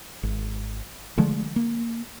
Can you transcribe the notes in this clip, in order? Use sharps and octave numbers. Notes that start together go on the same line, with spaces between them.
G#1
D3 F3 G#3 A3
A#3